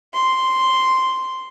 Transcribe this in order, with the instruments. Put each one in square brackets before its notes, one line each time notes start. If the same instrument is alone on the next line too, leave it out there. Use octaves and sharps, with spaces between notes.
[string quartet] C6